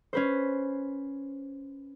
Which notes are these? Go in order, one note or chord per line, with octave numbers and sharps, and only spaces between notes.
C#4 B4 C5